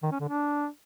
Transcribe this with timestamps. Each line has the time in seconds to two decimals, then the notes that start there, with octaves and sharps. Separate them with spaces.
0.03 D#3
0.11 C#4
0.20 D3
0.28 D4